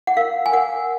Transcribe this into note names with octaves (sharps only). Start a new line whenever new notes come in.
F#5
A#4 F5
G#5
A#4 F#5